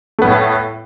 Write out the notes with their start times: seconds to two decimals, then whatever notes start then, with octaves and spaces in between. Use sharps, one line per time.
0.19 A3
0.22 B3
0.25 A2